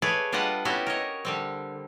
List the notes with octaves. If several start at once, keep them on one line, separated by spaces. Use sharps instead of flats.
A3 G#4 B4 C#5 D5
G3 D4 F4 B4 D#5 F#5
B3 C#4 E4 F#4 G4 G5
A#4 C#5 D#5
D3 G3 C4